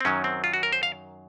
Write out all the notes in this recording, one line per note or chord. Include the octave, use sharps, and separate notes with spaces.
C4
F#2 D#3 F#3 C#4
C4
F4
F#4
A#4
C5
F5